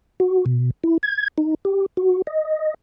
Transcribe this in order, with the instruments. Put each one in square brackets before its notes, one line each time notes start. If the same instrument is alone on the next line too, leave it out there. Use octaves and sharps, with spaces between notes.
[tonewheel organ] F#4
B2
E4
G#6
D#4
G4
F#4
D#5